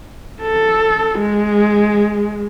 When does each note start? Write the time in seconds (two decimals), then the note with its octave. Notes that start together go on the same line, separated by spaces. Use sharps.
0.42 A4
1.19 G#3